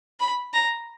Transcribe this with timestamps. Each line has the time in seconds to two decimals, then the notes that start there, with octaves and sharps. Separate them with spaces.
0.20 B5
0.53 A#5